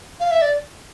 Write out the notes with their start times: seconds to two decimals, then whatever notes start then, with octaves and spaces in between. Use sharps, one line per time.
0.20 F5
0.31 E5
0.42 D5